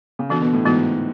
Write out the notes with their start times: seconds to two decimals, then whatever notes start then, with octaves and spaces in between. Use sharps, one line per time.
0.19 C#3
0.29 D3 E3 B3 F#4
0.42 B2
0.53 A2
0.65 G#2 E3 B3 F#4